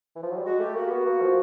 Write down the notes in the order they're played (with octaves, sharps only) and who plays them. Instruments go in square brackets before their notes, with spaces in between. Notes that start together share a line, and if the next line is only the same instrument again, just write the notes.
[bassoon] E3
F3
F#3
G3
[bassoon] G#3 [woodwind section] F#4
[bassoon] A3 [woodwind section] G4
[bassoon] A#3 [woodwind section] F#4
[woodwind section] G4
[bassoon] B3 [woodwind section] F#4
[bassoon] A#3
F3